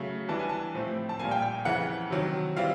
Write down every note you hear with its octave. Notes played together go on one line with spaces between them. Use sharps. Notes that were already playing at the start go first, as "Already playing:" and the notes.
Already playing: C#3 F#3 A3
E3 G3 B3 D4 A5
G#5
A5
A2 F3 A3 C4
A5
A#2 G3 A#3 G#5
G5
G5
F2 C#3 E3 F#5
C3 D#3 F#3
E3 G3 C4 F4 F5